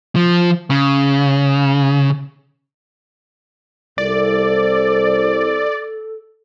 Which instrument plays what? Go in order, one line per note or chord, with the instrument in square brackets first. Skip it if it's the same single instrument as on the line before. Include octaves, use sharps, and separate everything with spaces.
[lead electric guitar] F3
C#3
[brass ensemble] C2 [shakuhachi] A4 [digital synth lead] D5